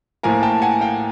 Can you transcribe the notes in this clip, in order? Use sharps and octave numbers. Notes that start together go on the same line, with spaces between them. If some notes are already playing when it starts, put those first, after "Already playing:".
A2 F3 A#3 G#5 A#5
G5 A5
F#5 G#5
F5 G5